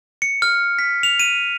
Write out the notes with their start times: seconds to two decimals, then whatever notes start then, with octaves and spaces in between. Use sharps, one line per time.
0.22 C#7
0.42 F6
0.79 B6
1.03 F7
1.20 D#7